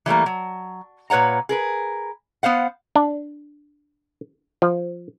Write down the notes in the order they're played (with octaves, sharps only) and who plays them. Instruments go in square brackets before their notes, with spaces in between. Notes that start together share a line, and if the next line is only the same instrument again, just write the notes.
[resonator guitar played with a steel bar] E3 G3 A3 A#3
F#3
A#2 B4 C#5 F#5 A#5
G#4 A#4 B4
B3 C5 F5 F#5
[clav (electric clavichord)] D4
F3